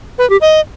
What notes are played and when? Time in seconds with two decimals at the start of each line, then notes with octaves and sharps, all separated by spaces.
0.18 B4
0.30 G4
0.41 D#5